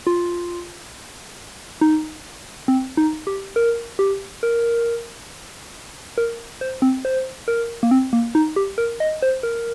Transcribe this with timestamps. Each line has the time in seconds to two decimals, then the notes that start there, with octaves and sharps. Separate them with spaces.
0.07 F4
1.81 D#4
2.68 C4
2.97 D#4
3.27 G4
3.56 A#4
3.99 G4
4.43 A#4
6.18 A#4
6.61 C5
6.82 C4
7.05 C5
7.48 A#4
7.83 A#3
7.91 C4
8.13 A#3
8.35 D#4
8.56 G4
8.78 A#4
9.00 D#5
9.22 C5
9.43 A#4